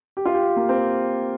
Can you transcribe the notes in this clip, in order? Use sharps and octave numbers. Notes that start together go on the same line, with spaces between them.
G4
F4
G4
A#3
C4